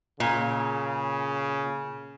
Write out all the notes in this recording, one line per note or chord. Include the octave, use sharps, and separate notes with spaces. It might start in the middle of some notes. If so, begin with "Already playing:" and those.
A#2 C#3